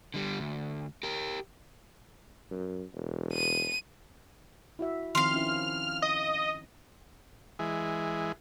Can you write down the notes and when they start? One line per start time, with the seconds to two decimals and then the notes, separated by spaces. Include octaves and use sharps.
0.14 D3 G3
0.40 D2
1.03 G4 A#4
2.51 F#2
2.94 E1
3.33 D#7
4.79 E4 F#4 E5
5.15 D#3 F3 C4 F5 C6 F6
5.34 C#4 E4
6.02 D#5
7.59 E3 G#3